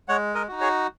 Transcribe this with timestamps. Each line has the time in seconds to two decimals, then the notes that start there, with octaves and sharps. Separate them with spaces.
0.08 G#3 C#5 F#5
0.35 A#4 D#5
0.48 D#4 F#4
0.61 G#4 C#5